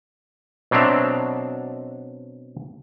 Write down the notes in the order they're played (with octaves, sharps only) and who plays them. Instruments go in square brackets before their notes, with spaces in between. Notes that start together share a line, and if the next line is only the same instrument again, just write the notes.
[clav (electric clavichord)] B2 F#3 C4 D4 E5 A#5